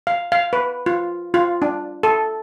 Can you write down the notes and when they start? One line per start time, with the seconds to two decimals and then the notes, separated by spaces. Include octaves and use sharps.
0.07 F5
0.32 F5
0.53 B4
0.86 F4
1.34 F4
1.62 D4
2.03 A4